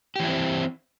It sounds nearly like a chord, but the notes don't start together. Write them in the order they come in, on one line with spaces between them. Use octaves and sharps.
G4 E3 E4 C4